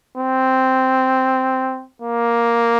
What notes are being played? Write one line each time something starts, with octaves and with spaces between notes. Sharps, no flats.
C4
A#3